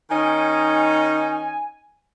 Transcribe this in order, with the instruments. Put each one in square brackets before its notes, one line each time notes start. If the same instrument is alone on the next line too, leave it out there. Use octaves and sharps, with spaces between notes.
[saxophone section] D#3 C#4 D#4 [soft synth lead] G#5